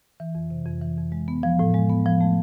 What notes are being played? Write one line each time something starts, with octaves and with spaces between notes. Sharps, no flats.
E3
F2
C3
F2
E3
F2
G#3
B3
F3
A2
G#3
B3
F3
A3